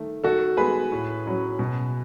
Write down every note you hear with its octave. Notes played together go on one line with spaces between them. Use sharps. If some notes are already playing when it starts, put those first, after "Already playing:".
Already playing: D#3 A3
D#3 F#4 A4
G#3 B3 G#4 B4
A2
F#3 C#4
B2